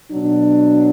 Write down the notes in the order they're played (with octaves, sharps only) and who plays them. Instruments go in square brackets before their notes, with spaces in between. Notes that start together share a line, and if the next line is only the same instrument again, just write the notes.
[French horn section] B2 F#3 D4